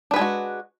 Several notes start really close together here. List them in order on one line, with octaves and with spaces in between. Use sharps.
D4 B4 G#4 G#3 F#4